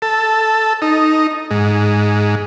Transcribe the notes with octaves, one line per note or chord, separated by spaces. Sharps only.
A4
D#4
G#2